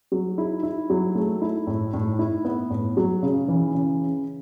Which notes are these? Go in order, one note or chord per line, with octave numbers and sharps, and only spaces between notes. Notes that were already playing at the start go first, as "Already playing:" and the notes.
F#3
E4
E4
F#3
A3
E4
A2
A2
E4
B3
A2
F#3
C#3
E3
C#3